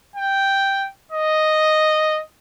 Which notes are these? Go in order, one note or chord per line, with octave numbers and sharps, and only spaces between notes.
G5
D#5